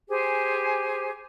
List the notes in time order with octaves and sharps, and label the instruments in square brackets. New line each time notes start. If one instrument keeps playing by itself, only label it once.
[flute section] G4 G#4 C5 G#5